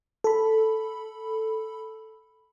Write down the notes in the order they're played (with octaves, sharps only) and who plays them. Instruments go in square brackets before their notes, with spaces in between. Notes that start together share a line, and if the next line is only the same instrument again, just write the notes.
[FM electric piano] A4 B5